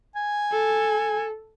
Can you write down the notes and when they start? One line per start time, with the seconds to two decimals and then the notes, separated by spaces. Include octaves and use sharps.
0.16 G#5
0.52 A4